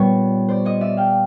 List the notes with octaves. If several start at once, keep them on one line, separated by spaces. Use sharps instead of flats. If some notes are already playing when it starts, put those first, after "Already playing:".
Already playing: A#2 G3 B3 B4 C#5
C5 D5
C#5 D#5
D5 E5
F5 G5